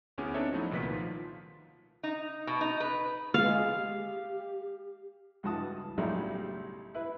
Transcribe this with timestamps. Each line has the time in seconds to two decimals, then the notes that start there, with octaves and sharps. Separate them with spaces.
0.18 D2 B3 C#4 E4 G#4 D6
0.34 C4 D4 D#4 A4 C#5 E5
0.52 F3 F#3 A3 D#4 E4 F#4
0.71 C2 A#2 D#3 B4 B6
0.90 F3 F4
2.03 D#4
2.47 B2
2.61 D#4
2.80 B4
3.34 G#3 F5
3.73 G4
5.43 C#2 G2 E3 F#4 A5 D#6
5.98 B1 A2 C#3 F#3 G3 A3
6.95 E4 B4